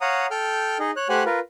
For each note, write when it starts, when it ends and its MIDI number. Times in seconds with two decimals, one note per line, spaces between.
0.01 0.26 73
0.01 0.26 77
0.01 0.26 78
0.01 0.26 82
0.01 0.26 87
0.31 0.78 69
0.31 0.78 79
0.31 0.78 89
0.31 0.78 91
0.80 0.91 63
0.80 0.91 68
0.80 0.91 75
0.96 1.08 73
0.96 1.08 90
1.09 1.23 57
1.09 1.23 67
1.09 1.23 72
1.09 1.23 78
1.09 1.23 80
1.09 1.23 90
1.26 1.39 65
1.26 1.39 70
1.26 1.39 71